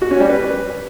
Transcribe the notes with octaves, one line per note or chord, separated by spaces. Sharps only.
F#4
C#4
G3
B4